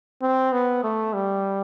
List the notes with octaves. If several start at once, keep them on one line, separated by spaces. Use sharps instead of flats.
C4
B3
A3
G3